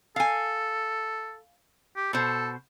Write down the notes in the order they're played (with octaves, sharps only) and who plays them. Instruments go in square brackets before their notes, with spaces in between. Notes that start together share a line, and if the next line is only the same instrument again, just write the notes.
[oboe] A4 [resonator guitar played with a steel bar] F5 G#5
[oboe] G4
[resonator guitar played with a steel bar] B2 C5 [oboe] A4